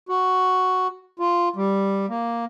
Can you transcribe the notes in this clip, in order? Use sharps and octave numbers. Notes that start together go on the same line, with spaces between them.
F#4
F4
G3
A#3